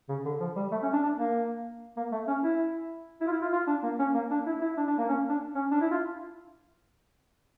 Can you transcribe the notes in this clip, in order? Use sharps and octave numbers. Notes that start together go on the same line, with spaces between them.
C#3
D3
F3
G3
A3
C#4
D4
D4
A#3
A#3
A3
C#4
E4
E4
F4
E4
F4
F4
D4
A#3
C#4
A#3
D4
E4
E4
D4
D4
A#3
C#4
D4
C#4
D4
E4
F4